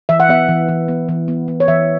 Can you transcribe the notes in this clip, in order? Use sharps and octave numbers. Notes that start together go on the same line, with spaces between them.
E3 E5
F#5
B3 E5
E3
E3
B3
E3
B3
B3
C#5
E3 E5